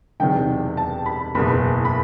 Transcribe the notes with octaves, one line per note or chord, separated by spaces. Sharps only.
E1 E2 C3 D#3 F#3 G5
A5
B5
F#1 E2 B2 B5
B5